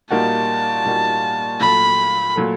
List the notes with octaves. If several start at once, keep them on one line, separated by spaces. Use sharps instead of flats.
A#2 G3 A#3 D#4 F#4 A5
A#2 G3 A#3 D#4 F#4
A#2 F#3 A3 B5
A#2 F#3 A3